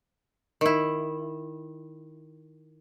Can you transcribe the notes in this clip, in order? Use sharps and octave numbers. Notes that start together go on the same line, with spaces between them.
D#3 E4